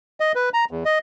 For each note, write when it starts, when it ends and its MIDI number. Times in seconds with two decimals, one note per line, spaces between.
0.20 0.32 75
0.35 0.49 71
0.54 0.65 82
0.71 0.84 40
0.85 0.99 75